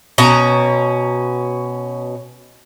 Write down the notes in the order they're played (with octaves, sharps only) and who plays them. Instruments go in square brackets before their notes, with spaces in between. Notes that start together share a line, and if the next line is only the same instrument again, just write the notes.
[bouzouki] B2 C#4 A#5